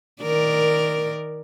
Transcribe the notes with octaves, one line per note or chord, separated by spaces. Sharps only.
D#3 A#4 D5